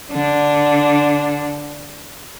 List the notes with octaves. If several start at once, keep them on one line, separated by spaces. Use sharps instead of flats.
D3 D4